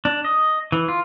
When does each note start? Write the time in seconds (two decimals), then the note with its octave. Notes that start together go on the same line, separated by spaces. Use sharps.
0.05 D4
0.24 D#5
0.72 E3
0.88 F4